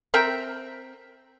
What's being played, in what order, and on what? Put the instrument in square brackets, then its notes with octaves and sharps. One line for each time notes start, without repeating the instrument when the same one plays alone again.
[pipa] C4 A#4 E5 G5